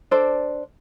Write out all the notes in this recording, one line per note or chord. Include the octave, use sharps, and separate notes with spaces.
D4 A4 C5 D5